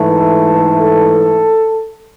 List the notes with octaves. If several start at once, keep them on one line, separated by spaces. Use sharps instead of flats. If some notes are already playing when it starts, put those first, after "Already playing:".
Already playing: G#2 E3 A3
A4
A4